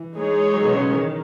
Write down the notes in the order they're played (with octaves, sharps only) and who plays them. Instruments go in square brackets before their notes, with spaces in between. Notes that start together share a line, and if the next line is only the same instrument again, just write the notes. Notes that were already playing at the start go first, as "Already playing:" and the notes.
Already playing: [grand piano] E3
[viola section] G#3 D#4 G#4 C#5
[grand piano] F#3
B2 B3
C#3 C#4
[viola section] D#3 [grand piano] E3